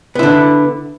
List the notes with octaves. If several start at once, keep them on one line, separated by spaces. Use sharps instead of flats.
D3 B3 E4